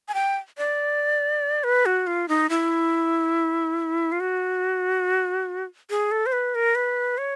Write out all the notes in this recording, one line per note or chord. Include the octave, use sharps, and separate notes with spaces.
G#5
G5
D5
B4
F#4
F4
D#4
E4
F4
F#4
G#4
A4
C5
B4
A#4
B4
C#5